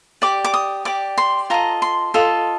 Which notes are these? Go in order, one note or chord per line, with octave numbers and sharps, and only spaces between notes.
G4 D5 D6
D6
D#6
G4 D5 D6
C6
F4 A4 D#5 A#5
C6
F4 A4 D#5